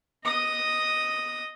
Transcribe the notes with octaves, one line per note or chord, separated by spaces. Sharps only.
D#5 D#6